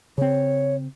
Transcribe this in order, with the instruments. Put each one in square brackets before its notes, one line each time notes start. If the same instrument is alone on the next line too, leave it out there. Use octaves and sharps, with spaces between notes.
[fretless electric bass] C#3 C4 [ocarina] C#5